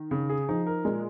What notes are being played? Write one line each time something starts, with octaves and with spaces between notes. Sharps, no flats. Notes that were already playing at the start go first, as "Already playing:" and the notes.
Already playing: D#3
C#3
G#4
F3 D#4
A#4
A#2 G#3